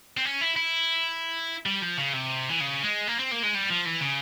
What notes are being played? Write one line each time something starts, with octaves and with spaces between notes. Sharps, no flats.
C4
C#4
E4
E4
G3
F3
C#3
C3
E3
C#3
G#3
A#3
C4
A#3
G#3
G3
F3
E3
C#3